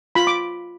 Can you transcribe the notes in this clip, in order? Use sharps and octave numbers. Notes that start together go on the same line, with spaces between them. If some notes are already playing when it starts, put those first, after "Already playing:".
F4 B5
D6